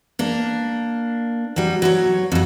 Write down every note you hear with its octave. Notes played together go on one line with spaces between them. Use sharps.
A#3 D4
F#3 G3
F#3 C5 C#5
F2 F#3